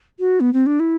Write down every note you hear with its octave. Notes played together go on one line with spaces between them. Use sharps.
F#4
B3
C4
D4
E4